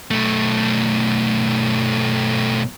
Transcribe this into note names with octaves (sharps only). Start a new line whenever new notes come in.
B1 A3